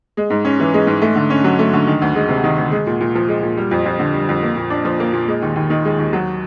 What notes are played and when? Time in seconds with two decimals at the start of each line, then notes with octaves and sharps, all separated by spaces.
0.17 G#3
0.30 G#2
0.45 C#4
0.60 E3
0.74 G#3
0.87 G#2
1.02 A3
1.16 D3
1.30 C#4
1.44 F#3
1.59 A3
1.73 D3
1.87 D#3
2.02 D2
2.15 G#3
2.29 C3
2.44 D#3
2.57 D2
2.72 G#3
2.87 A#2
3.01 A#2
3.15 F3
3.28 G#3
3.42 A#2
3.57 G3
3.71 F2
3.86 F2
3.99 D3
4.13 G3
4.29 F2
4.43 A#3
4.56 A#2
4.70 D4
4.85 F3
5.00 A#3
5.13 A#2
5.28 G#3
5.42 D#2
5.56 D#2
5.70 D#3
5.85 G#3
5.98 D#2
6.13 F#3